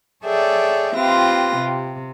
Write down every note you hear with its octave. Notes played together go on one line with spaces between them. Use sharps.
G#4 A4 C#5 D5 E5 G5
C4 F4 G4 B4 A#6
C3